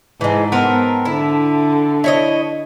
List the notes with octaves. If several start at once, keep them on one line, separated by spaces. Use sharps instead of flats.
G#2 E3 G#3 A5
B3 C4 A#4 A5
D3 E4
E4 C#5 D#5